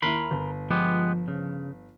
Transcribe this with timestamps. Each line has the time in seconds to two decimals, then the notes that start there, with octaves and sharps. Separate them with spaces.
0.02 D#2 E4 A#4 B5 C6
0.31 G1
0.71 F3 G#3 B3 G4
1.28 C#3